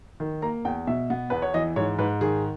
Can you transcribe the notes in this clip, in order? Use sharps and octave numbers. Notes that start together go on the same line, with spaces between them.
D#3
A#3 A#5
E2 G5
B2 E5
B3
E2 B4
C#5
E3 D#5
G#2 C#5
G#2 B4
D#3 G#4